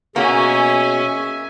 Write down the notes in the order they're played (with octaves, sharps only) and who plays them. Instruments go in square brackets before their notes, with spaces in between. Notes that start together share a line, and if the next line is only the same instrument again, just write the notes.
[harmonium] B2 G#4 [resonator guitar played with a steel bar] A#3 F#4 [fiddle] C#4 [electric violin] E5 G#5